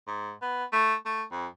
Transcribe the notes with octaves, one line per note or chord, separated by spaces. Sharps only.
G#2
B3
A3
A3
F2